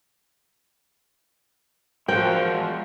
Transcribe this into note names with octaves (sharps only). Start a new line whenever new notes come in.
F3 G#3 F#4 A#4 C5 G5